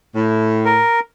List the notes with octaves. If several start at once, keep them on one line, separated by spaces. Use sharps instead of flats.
A2
A#4